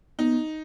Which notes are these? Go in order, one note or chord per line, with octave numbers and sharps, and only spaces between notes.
B3 D#4